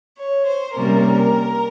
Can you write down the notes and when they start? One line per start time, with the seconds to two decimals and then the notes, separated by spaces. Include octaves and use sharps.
0.17 C#5
0.46 C5
0.74 C3 G3 A#3 C#4 A#4